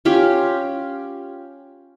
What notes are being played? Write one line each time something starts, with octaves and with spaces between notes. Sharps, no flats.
C#4 F4 G4